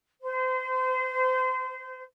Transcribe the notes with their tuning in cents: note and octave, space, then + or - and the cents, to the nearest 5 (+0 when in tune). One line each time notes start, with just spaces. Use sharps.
C5 -30